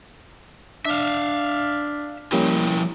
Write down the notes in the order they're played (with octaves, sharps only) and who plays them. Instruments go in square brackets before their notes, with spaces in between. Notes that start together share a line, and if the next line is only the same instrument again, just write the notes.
[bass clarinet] D4 [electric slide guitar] E5 F5
[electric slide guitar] F3 E4 G5 [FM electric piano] G3 A#3 C#4